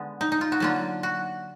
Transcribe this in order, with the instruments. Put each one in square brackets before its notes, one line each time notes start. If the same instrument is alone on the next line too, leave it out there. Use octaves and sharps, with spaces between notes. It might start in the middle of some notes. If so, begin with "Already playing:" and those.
Already playing: [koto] D3 G#3 B3
D#4
D#4
F4
F#4
D3 F#3 A#3 F4
F#4